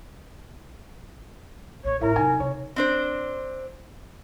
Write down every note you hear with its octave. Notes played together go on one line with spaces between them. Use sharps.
A#1 C#5
A1 E4 A#4 E5 A#5
C3 F#3 D#4 G#5
C3 C#5
C4 D4 C5